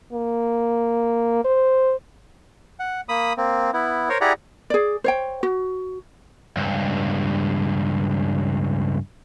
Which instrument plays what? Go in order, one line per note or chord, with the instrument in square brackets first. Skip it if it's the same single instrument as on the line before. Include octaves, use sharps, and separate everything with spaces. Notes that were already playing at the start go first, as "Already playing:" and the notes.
[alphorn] A#3
C5
[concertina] F#5
A#3 B5 D#6
A#3 C4
B3 E4
A#4 C5 C#5
E4 G4 G#4 D5 F#5 A#5
[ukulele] G#4 D5
C5 C#5 G5
F#4
[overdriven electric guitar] C#2 G2